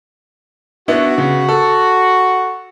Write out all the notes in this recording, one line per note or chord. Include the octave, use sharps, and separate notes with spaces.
B3 D4 E4 F#4
C#3
A4